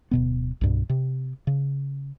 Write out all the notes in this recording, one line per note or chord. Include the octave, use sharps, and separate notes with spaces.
D1 B2 B3
C2 G2 B2
C3
C#3